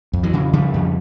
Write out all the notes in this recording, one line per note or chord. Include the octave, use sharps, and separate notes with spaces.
F2
E3 F#3
C#3
C#3 F3 G3
F2